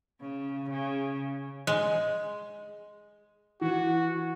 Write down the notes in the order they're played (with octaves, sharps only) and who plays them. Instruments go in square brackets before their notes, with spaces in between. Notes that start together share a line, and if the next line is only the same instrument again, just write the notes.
[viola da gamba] C#3
C#3
[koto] G#3
[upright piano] E3 [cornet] F#4